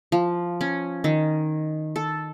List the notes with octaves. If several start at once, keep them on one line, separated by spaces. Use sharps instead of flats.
F3
C#4
D#3
A4